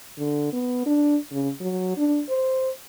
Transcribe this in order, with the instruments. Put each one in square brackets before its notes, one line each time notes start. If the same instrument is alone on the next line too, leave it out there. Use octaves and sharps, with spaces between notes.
[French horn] D3
B3
D4
C#3
F#3
D4
C5